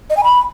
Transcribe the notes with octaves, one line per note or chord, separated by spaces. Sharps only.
D#5
G#5
B5